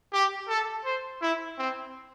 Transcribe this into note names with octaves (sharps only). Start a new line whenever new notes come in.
G4
A4
C5
E4
C4